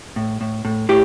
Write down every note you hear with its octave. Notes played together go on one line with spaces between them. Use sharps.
A2
A2
A2
A2 G4